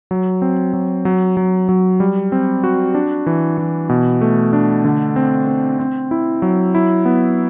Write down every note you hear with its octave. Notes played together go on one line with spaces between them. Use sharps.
F#3
C4
F#3
F#3
F#3
F#3
G3
C4
F#4
D4
E3
E3
B2
A3
D4
D3
C4
C4
C4
E4
F#3
E4
B3